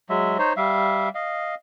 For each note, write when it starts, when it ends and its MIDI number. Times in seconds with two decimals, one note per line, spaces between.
0.09 0.37 54
0.09 0.37 56
0.09 0.37 76
0.39 0.53 63
0.39 0.53 72
0.39 0.53 73
0.57 1.09 55
0.57 1.09 76
0.57 1.09 77
1.15 1.55 75
1.15 1.55 77